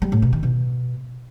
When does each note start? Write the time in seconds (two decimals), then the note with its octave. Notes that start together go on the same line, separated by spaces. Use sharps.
0.02 G3
0.12 A2
0.22 B2
0.33 D#3
0.43 B2